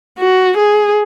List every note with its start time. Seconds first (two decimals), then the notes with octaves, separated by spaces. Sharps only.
0.19 F#4
0.57 G#4